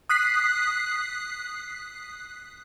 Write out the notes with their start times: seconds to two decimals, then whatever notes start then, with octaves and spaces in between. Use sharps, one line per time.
0.09 D#6 F#6 B6 C7